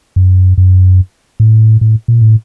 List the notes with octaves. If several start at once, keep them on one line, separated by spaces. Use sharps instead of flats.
F#2
F#2
A2
A2
A#2
A2